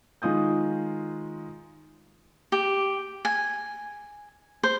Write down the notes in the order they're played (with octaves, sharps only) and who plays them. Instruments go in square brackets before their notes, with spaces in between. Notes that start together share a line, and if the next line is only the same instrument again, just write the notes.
[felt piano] D#3 G#3 F4 D#6 G6
[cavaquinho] G4
G#5
C5